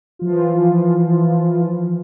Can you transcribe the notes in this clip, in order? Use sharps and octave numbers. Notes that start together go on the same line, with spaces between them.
E3 F3 F4